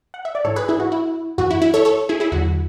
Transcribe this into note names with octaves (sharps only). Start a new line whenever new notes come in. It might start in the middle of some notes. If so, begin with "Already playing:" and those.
F#5
E5
D5
G#2 E3 A4 C#5
G#4 B4
E4 G#4
F#4
E4
F#2 E3 F#4
E4
E4
A4 C#5
A4 C#5
E4 G#4
E4 G#4
E2 D3 F#3 F#4